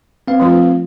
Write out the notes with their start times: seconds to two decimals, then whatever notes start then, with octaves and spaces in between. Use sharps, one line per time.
0.28 C4 B4 F5
0.40 F3 A3 F4